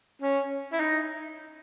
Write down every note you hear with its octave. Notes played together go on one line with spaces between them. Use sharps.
C#4
E4
D#4